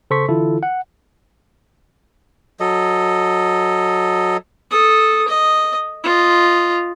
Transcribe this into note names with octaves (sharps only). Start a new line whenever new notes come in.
C#3 A4 C5 C6 C#6 B6
D3 E3 E4 F4 A4
F#5
F#3 A4 D#5
A4 D#6
D#5
F4 D#5